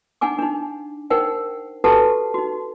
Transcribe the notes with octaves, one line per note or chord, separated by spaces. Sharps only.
D4 D#4 F#5 G#5 D6
D4 D#4
D#4 A#4 C5 F#5 G5
F#4 G4 A4 B4 F#5 A5
D#4 F#4